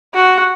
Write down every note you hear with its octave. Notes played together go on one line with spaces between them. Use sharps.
F#4